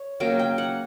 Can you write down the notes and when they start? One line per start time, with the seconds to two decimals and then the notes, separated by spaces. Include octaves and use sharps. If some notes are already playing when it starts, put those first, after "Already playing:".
Already playing: C#5
0.20 C#3 F#3 A#3 G5
0.39 G5
0.58 F#5